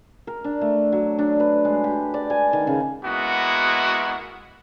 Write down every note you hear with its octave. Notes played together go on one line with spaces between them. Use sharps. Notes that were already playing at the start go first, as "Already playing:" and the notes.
A#4
D4
A3
F#3
D4
B4
G#3
G4
D5
G#5
D#3
C#3
G#3 A#3 B3 E4 F#4